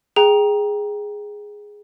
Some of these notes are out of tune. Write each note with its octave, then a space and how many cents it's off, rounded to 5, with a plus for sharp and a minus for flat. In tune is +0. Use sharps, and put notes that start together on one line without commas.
G#4 +0 G5 +0 A#5 +15